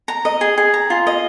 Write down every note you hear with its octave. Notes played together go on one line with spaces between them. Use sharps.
A#5
D#5
G#4
G#4
A#5
F4
D#5